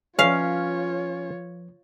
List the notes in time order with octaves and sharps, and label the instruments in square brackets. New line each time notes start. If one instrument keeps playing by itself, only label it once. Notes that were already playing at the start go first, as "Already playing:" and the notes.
[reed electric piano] F3 B4 [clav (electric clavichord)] C#4 [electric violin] F4 C#5 [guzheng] F5